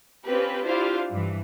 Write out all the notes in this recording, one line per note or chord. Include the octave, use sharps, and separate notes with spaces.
C4 C#4 F4 G4 B4
D4 E4 F4 G4 C5 F5
G2 E3